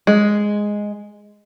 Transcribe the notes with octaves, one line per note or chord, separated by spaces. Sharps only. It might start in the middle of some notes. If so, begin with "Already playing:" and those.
G#3